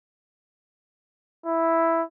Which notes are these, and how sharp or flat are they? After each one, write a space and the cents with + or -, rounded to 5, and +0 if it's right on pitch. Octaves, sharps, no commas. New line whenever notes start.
E4 +0